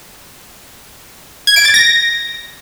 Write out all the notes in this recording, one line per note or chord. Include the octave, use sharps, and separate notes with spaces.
G#6
D7
A6
A#6